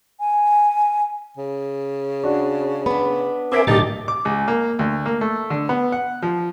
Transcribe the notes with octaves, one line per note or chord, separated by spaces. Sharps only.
G#5
C#3
D4 F#4
B3 D4 B5
C4 A#4 E5 G#5 D6 B6 D7
B1 A2 D3 D#4 G4 A5 D6 A6
D6
C#2
A#3
D2
A#3
A3
D3
B3
F#5
F3